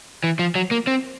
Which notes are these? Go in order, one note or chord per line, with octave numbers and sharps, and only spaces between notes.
E3
F3
F#3
A#3
C4